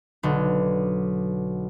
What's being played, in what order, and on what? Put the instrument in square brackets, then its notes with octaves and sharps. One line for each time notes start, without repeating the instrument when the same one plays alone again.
[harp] B1 D3